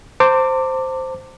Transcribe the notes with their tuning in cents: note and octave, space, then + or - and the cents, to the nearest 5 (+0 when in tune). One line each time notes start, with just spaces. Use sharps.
C5 +0 A5 +45 D6 +0